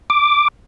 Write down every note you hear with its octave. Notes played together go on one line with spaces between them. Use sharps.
D6